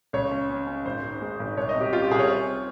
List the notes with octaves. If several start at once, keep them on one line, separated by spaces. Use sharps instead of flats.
C#2 C#5
C#4
C#4
C#4
G#1 C5
G#2
G#3
G#1
C2 C#5
D#5
C3
G4
C#4 F4
G4
C2 G#4
C#5
C4
C4